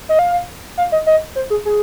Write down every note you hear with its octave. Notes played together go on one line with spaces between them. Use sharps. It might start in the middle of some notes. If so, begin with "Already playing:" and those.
D#5
F5
F5
D#5
D#5
C5
G#4
G#4